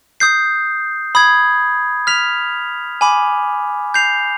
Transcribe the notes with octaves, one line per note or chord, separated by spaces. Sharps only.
D#6 G6 C7
B5 D#6 G#6
F6 B6 F7
G#5 B5 D6
G6 C7 F7